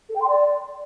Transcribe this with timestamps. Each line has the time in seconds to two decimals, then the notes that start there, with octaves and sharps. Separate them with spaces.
0.09 A4
0.15 G5
0.22 C6
0.28 D5